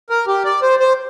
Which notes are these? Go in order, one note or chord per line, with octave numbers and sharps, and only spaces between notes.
A#4
G4
D5
C5
C5